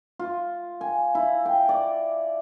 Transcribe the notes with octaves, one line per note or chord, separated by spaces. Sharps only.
F4
G#5
E4
G5
D5